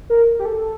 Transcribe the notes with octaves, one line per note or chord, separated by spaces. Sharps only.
A#4
G4
A4